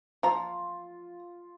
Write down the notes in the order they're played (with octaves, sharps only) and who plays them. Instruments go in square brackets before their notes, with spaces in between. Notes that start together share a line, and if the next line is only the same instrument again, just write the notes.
[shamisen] F3 A#5 [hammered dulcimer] F4